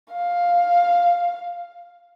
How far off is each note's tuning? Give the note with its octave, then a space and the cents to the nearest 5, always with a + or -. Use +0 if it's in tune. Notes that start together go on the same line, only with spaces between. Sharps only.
F5 +5